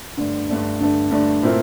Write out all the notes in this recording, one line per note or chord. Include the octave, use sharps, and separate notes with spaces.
G2 D3 A3 D4
G2 D3 A3 D4
G2 D3 A3 D4
G2 D3 A3 D4
A#2 A3 C4 E4 A#4